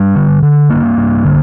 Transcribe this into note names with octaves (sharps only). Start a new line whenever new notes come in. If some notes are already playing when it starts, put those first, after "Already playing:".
Already playing: G2 G3
D3
D3
G2 A#3
G2
D3